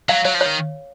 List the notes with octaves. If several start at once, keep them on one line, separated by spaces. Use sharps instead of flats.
F#3 F5
F#3 C#5
F3
D#3 C#5